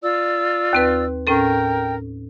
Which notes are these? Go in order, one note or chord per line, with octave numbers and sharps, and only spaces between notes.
F4 D5 E6
D#2 C4 B4
A2 C#4 A4 A#4 G5